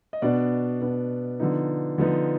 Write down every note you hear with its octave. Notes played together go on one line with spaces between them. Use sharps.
D#5
B2 B3 D4 D5
B2 B3 D4
D3 F3 B3 D#4
D3 F3 B3 D#4